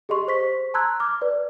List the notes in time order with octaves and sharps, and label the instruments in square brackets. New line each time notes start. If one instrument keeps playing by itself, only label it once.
[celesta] G4 G#4 D#5 C6 C#6
C5 C#6 B6
A5 A#5 C6 E6 F#6 G#6
D6 F6
B4 D5